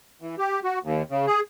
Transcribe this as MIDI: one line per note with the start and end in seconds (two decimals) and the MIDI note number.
0.21 0.35 52
0.38 0.60 67
0.64 0.79 66
0.83 1.02 39
1.10 1.26 49
1.27 1.40 68